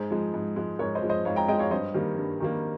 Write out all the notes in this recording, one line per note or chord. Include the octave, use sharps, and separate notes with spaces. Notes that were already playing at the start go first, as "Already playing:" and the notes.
Already playing: G#2 G#4 C5
F3 G#3
G#2
F3 G#3
G#2 A#4 C#5
C5 D#5
F3 G#3
C5 D#5
G#2 C#5 F5
G5 A#5
F3 G#3 D#5 G5
C#5 F5
G2 C5 D#5
D#3 G3 A#3
G2
D#3 G3 A#3